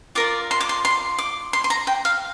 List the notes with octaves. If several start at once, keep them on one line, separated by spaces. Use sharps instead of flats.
F4 A#4 D5 D6
C6
D6
C6
C6
D6
C6
C6
A#5
G5
F5